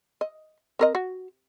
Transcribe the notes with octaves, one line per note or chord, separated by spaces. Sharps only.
D#5
C4 A#4 D#5
F#4